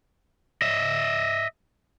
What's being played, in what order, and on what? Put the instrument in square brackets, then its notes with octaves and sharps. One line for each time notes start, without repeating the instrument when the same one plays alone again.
[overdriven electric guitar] D#5 E5